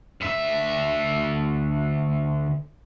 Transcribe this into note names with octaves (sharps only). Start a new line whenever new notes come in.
D2 E5